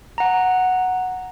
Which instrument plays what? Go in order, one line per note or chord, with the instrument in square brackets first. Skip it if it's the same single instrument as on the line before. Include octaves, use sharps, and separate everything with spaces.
[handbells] F#5 A#5